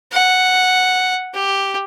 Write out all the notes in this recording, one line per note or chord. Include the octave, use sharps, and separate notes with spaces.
F#5
G4